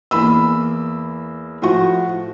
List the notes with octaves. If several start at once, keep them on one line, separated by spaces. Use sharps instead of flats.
E2 A#3 B5 E6
A2 F3 F#4 C#6